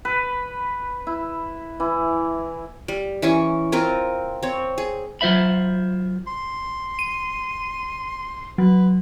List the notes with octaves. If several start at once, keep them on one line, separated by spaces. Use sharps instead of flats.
B4
E4
E3
G3
E3 C#4 G#5 C#6
C4 F4 A#4
C4 C#5
G#4
F#3 F4 C5 E5 B5
C6
D#7
F#3 B4